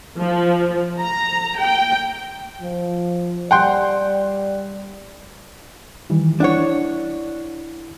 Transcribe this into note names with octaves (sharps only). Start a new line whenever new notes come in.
F3
A#5
G5
F3
G3 D5 F#5 G5 C6
D#3 E3 G3
D4 E4 C#5 F#5